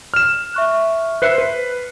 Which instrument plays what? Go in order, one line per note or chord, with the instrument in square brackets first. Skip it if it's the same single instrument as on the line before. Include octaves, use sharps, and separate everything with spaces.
[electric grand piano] F6 E7
[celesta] E5 C#6 F#6
[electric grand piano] B4 C5 E5 [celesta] F#6 C7 C#7
[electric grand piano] B4